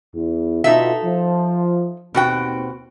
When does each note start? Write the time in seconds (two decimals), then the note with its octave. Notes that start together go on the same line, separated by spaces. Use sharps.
0.15 E2
0.64 B2 D#4 F4 A4 E5
1.05 F3
2.14 D#2 B2 C4 F#4 G5